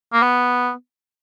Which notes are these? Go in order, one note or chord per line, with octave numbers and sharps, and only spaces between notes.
A#3
B3